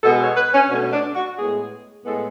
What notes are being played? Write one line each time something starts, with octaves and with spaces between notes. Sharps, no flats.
B2 G#3 B3 A4
C#5
B4
C#4
B2 A3 C#4
D4
F#4
A2 G#3 B3 G#4
A2 G#3 B3 A4